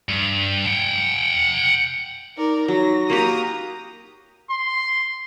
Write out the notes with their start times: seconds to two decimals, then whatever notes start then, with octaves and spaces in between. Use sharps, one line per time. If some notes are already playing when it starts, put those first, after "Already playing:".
0.09 G2
0.66 F#5 G5
2.37 D#4 A#4 D5
2.68 F#3 A#6
3.10 A#3 F#4 G4 A#5 D#6
4.50 C6